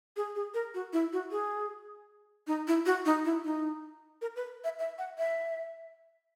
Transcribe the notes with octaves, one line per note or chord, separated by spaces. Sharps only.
G#4
G#4
A#4
F#4
E4
F#4
G#4
D#4
E4
F#4
D#4
E4
D#4
A#4
B4
E5
E5
F#5
E5